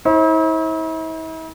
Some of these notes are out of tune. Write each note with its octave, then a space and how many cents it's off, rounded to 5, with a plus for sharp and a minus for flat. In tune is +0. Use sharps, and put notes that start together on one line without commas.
E4 -45 C5 +35